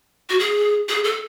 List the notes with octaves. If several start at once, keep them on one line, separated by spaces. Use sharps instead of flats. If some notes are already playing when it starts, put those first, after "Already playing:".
F#4
G#4
G#4
A4